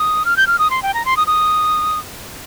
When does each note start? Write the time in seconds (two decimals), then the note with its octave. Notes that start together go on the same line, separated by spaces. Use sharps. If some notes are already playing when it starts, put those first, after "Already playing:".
Already playing: D#6
0.25 F6
0.37 G6
0.47 F6
0.59 D#6
0.71 C6
0.83 G5
0.94 A#5
1.05 C6
1.17 D#6
1.27 D#6